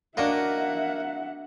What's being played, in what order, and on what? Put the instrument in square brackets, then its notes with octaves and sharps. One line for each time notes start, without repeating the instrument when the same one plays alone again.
[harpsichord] A#3 [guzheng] D4 F#4 D#5 [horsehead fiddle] E5 F#5